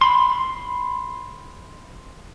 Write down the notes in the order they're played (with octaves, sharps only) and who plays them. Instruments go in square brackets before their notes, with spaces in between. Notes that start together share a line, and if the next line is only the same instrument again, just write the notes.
[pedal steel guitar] B5 C6